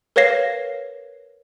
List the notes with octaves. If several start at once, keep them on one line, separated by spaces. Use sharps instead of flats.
A#4 B4 C#5 F5 A#6 C7